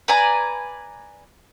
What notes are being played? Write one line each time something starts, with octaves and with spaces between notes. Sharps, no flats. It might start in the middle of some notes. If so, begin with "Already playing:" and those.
B4 D5 G#5 A#5